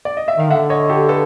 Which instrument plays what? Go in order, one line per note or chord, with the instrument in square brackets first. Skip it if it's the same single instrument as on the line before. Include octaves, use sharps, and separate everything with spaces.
[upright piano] D5
D#5
E5
[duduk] D#3 [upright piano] F5
[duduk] D3 [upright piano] E5 F#5
[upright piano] C#5 D#5
G4 A4
A4 B4